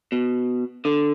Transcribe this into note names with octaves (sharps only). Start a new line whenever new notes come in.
B2
D3